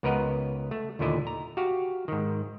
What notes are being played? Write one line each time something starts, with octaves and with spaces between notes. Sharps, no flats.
C#2 B3 A#4 B4 D#5 F#5
A3
D#2 A#2 D3 A3 E4 D#5
A#5
F#4 G4 F5
G#2 D#3